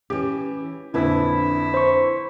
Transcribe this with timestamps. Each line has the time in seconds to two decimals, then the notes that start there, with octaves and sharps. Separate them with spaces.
0.10 E3 C#4 G4
0.94 A#1 F2 D3 D4 E4 B4
1.74 C5 C#6